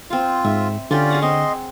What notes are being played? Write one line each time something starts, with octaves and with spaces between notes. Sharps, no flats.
C4 F4 F5
G#2 E5
D3 C#4 F4 G4 D5
G#4 F5 F#5
C4 D#5 C6